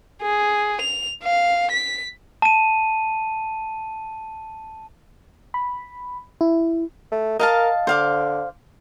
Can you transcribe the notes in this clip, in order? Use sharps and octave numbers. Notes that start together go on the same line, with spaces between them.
G#4
F7
F5
B6
A5 D#7
B5
E4
A3
A#4 D#5 F5 A5
D3 C5 F5 D6